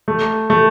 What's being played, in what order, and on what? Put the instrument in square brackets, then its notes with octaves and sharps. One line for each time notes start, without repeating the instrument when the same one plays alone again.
[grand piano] A3
A3